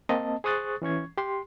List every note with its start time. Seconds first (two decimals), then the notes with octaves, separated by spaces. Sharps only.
0.09 A#3 C4 D#5 A5
0.44 G#4 C5 C#6 D#6 F#6 A6
0.82 E3 C#4 C#6 G#6
1.18 G4 C6